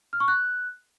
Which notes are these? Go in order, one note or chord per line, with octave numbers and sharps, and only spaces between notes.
F6
C#6
F#6